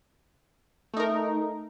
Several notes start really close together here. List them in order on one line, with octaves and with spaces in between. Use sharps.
A3 D#4 A#4